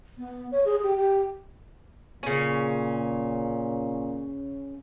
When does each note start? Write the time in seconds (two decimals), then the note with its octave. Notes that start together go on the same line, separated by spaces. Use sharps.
0.18 B3
0.52 C#5
0.65 G#4
0.83 G4
0.97 G4
2.23 A#2 C#3 C#4